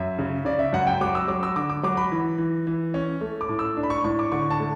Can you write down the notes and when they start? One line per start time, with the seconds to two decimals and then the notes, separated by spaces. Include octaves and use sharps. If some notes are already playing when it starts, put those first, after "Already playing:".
Already playing: F#2 E5
0.19 C#3
0.45 C#3 D5
0.59 E5
0.73 F#2 F#5
0.87 G5
1.01 F#3 D6
1.15 E6
1.28 F#3 D6
1.43 E6
1.56 D3 D6
1.70 D6
1.83 F#3 D6
1.97 B5
2.12 E3
2.38 E3
2.67 E3
2.94 C#4
3.21 A3
3.41 D6
3.49 A2
3.59 E6
3.77 D4
3.83 B5
3.90 C#6
4.04 A2 C#6
4.19 D6
4.32 D3 C#6
4.50 A5
4.60 A3